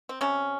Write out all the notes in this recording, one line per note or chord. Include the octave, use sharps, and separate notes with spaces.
C4
C3 C#4